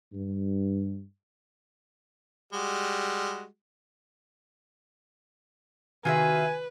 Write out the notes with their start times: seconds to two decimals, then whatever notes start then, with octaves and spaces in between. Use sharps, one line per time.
0.13 G2
2.53 G3 G#3 F#4
6.05 C3 D#3 F4 F#4 G#4 B4 E5 G#5